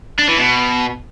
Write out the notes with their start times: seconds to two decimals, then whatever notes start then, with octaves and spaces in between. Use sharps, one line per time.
0.19 D4
0.29 E3
0.38 B2